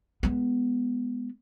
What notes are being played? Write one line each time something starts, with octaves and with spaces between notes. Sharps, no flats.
G#3 B3